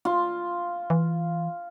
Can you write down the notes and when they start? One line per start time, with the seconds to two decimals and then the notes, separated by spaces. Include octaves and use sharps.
0.05 F4
0.90 E3